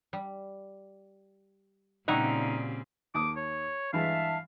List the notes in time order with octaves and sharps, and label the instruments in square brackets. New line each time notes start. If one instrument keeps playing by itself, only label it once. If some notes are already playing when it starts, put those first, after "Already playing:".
[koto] G3
[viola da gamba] A#2 C#3 C4 [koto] G3 E4 F#4 [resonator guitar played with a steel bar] D#4
[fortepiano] D#2 A5 D#6 [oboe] D6
[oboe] C#5
[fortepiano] G2 E3 G#3 [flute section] E5 A5 [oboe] F5